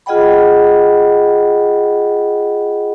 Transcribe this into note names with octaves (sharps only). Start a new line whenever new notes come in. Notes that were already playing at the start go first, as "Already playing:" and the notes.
F4 G#4 D#5 F#5 G5 B5